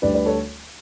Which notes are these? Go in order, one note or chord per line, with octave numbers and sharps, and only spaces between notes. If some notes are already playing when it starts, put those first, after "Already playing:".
D2 D3 G3 B4 D5
B4 D5
A4 C#5